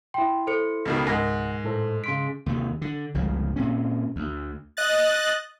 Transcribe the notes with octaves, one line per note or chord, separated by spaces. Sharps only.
E4 G5 C6
A4 C5 C#7
C#2 B2 D#3
C#2 G#2 B2 A#4 F#5 G#6 A#6
A2 A4 C5
C#3 C6 B6 D7
D#2 C3 D#3
D3
G1 C#2 C#3 F3
A#2 C4 C#4
D2
D#5 F#6 A6